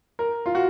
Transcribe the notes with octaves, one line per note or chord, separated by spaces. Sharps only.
A#4
F4
F#4